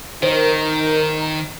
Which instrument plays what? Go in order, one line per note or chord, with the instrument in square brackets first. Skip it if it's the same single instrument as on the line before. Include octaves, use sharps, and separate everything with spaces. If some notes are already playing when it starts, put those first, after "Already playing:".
[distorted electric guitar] D#3 [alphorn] D#4 [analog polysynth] A#4 [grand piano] C5